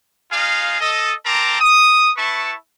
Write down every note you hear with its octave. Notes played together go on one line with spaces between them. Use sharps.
D#4 F4 G#4 F5
A4 D#5
C4 A#4 A5 A#5 C6 D6
D#6
E4 B4 A5 C#6